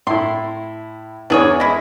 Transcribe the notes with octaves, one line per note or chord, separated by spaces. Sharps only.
A2 E4 C6
E2 E3 D4 G#4 C#5
G#3 E4